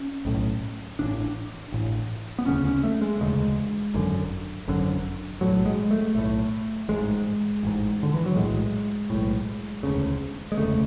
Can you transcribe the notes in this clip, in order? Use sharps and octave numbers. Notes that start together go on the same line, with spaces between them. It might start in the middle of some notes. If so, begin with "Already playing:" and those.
Already playing: C#4
B1 A2
A1 A2 D4
A1 A2
B3
E1 D2 C#3 C#4
C#4
A3
G#3
E1 D2 C#3 G#3
G#1 F#2 D3
G#1 F#2 D3
B1 A2 F#3
G#3
A3
B1 A2 A3
A1 G#2 G#3
A1 G#2
D3
E3
F#3
B1 A2 G#3
B1 A2
E1 D2 C#3
G#3
E1 D2 C#3 A3